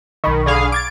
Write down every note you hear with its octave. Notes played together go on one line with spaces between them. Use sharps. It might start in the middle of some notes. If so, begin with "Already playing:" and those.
B1 D#3 B5 C#6
D3 G#4 F5
D6 G#6 A6 D7